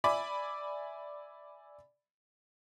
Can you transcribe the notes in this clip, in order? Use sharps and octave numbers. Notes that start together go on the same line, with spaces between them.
D5 E5 G#5 B5 D6